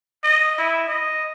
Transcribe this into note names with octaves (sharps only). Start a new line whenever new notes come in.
D#5
E4
D#5